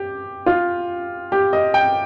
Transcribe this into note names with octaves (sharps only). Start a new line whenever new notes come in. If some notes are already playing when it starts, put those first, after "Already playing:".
Already playing: G4
F4
G4
D#5
G5